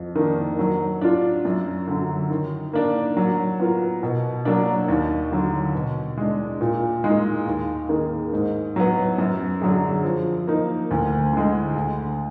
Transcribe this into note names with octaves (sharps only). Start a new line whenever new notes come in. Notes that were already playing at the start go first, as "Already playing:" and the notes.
Already playing: F2
D#3 A#3 D4
F#3
D4 F4
F#2
D3 F#3
D#3
A#3 D4
F#3
B3 F4 A#4
B2
F#3 A#3 D4
D#2
D3 F#3
B2
G#3 D4
A#2
G#3 D#4
D#2
D#3 A#3 D#4 G#4
G#2
F#3 B3
F#2
D3 F#3 D4 G#4
F3
A#3 D#4
D2
D3 G#3
D2